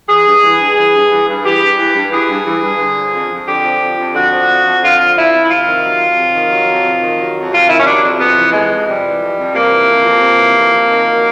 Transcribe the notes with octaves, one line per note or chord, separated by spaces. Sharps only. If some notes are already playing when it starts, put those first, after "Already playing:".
E3 G#4
G2
E3
G2
E3
G2
E3
G2
E3 G4
G2
E3
G2
E3 G#4
G2
E3
G2
D3
F3
F2
F2
D3 G4
F3
F2
F2
D3 F#4
F3
F2
F2
D3 F4
F3
F2 E4
F2
E4
C3 F4
D#3
F#3
F2
C3
D#3
F#3
F2
C3
D#3
F#3
F2
C3 F4
D#3 E4
C#4
F#3 D4
F2
C3 B3
E3
F2 G#3
F2
C3 G3
E3
F2
F2
C3 A#3
E3
F2
F2
C3
E3
F2
F2
D#3
F#3